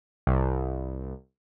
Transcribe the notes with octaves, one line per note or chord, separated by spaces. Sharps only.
C2